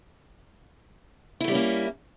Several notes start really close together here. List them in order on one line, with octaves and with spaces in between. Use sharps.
E4 A3 G3 C#4 A#3